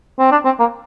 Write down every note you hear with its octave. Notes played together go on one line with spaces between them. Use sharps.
C4
D4
C4
A#3